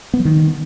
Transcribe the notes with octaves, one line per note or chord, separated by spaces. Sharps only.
B3
F#3
D#3